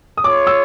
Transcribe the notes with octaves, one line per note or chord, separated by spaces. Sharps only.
D#6
F4 G#4 C#5 D6
E6